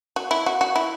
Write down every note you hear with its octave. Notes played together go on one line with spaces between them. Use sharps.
F#4
E4
F#4
F#4
E4